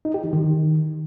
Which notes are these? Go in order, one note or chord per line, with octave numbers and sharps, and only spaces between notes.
D#4
G4
E3
D#3